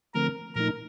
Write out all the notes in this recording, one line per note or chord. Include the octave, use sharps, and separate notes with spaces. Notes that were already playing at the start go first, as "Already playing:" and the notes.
D3 F3 A3 C4 A#4
A#2 F3 A3 D#4 A#4